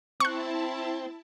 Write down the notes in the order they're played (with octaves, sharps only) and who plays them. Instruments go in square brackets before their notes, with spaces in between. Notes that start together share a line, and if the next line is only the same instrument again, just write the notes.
[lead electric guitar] C4 [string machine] E4 A5 [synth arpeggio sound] C#6 F#6